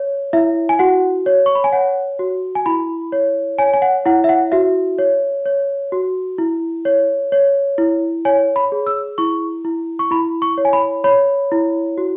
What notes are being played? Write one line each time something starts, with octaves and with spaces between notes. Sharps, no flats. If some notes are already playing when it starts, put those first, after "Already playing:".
Already playing: C#5
E4 E5
G#5
F#4 F#5
C#5
C#6
B5
G#5
C#5 F#5
F#4
G#5
E4 B5
C#5
C#5 G#5
G#5
F#5
E4 F#5
E5
F#5
F#4 E5
C#5
C#5
F#4
E4
C#5
C#5
E4
C#5 G#5
B5
G#4
E6
E4 C#6
E4
C#6
E4 B5
C#6
C#5
G#5
B5
C#5 B5
E4
F#4